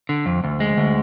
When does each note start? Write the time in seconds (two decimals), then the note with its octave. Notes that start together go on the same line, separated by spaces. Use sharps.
0.09 D3
0.26 F2
0.44 D2
0.60 G#3
0.77 D2